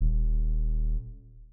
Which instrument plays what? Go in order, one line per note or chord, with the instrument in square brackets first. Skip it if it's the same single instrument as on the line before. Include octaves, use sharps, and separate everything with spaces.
[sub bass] D#1